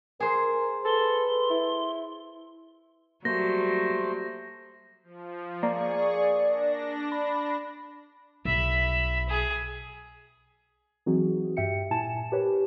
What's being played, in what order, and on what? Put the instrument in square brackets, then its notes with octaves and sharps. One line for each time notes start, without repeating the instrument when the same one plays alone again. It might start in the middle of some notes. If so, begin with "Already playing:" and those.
[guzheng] G#4 C5 [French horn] A#4
[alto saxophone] A4 [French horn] B4 [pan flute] C6
[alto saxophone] E4
[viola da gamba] F#3 G3 [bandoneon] A3 C5 [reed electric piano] A#3 [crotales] A#6
[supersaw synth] F3
[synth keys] A#3 [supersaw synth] G#4 C#6 [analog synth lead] D5
[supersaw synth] D4 A#6
[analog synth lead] B5
[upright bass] B1 [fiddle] E5 B5
[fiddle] G#4
[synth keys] E3 F#3 C4 D#4 F#4 G#4
G2 G4 E5 G5 C#7
A#2 E4 G#5 A5 E7
G4 A#4 B4 C#5